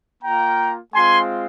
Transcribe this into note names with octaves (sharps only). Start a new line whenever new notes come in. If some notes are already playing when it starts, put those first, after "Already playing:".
A#3 F4 G5 A#5
G#3 C4 F4 G#5 C6